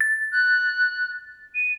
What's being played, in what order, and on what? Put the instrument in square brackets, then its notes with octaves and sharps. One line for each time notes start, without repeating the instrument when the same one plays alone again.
[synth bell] A6
[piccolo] F#6
D#7